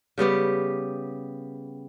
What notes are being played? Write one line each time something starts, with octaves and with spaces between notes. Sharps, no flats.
C#3 G3 B3 G4